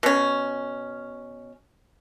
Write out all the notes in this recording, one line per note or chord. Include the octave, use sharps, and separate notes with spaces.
B2 C#4